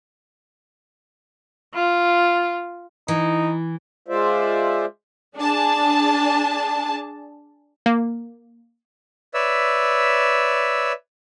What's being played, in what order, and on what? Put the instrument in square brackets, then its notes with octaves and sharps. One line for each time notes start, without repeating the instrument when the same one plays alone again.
[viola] F4
[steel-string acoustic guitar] E3 [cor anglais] D#4
[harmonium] G#3 F4 C5 D5 E5
[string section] D4 G#4 A5
[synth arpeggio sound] A#3
[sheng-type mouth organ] B4 C#5 D5 E5 E6